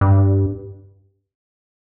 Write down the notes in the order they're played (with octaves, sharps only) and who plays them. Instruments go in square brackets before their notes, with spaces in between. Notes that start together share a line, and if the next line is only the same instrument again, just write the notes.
[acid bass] G2